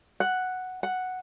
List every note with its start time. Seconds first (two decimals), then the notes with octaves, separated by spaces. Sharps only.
0.20 F#5
0.83 F#5